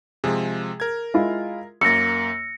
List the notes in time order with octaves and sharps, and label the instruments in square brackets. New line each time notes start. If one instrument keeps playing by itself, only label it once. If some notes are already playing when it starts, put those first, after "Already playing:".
[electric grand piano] C3 F3 G#3 [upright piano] G#4
[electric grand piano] A#4 G#6
[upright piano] G#3 E4 F4
[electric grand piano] F#2 A#3 [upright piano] E6 A6 [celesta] A#6 C#7